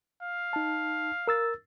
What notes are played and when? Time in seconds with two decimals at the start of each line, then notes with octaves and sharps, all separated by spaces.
0.23 F5
0.53 D#4 A5
1.27 A#4 E6 A6